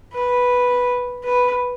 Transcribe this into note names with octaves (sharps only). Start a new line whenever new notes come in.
B4
B4